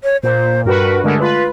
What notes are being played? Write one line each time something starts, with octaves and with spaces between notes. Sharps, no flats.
C#5
A#2 C5
G2 F#4 A#4 B4
D3 G#3 A3 A#4
F4 B4